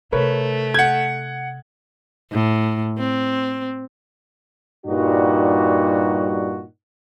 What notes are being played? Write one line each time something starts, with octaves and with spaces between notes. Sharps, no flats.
C3 A3 A#4 B4 C#5
F#5 G6 G#6
A2
C4
G2 A#2 G3 D#4 F#4